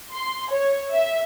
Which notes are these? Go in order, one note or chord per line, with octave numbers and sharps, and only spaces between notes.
C6
C#5
E5